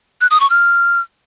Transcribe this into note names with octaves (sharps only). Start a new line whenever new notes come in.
F#6
D#6
C#6
F6